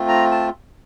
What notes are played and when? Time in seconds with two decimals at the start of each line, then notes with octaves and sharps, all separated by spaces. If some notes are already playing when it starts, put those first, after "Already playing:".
Already playing: A3 C4 F4
0.09 A#5
0.31 A5